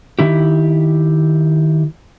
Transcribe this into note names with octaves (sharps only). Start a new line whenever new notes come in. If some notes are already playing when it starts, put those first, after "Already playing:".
D#3 E4 G4